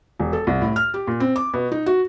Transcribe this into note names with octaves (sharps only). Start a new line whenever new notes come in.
E1
A4
C2
A2
F6
G4
A#2
C4
D6
B2
D#4
F#4